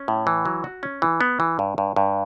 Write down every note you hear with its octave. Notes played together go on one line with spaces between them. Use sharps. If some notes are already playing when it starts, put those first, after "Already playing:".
Already playing: C#4
A2
E3
F#3
F#4
C#4
E3
B3
E3
G2
G2
G2